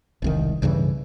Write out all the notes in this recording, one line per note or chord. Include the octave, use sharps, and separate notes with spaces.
E1 C2 D#3
B1 G2 C#3 E3